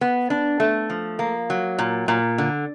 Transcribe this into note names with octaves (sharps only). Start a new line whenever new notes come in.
B3
D4
A3
F3
A#3
F#3
A#2
A#2
D3